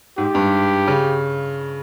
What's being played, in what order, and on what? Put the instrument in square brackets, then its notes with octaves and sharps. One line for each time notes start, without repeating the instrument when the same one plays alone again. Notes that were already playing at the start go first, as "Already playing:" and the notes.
[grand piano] G#2 [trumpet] G4
[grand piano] G2
C#3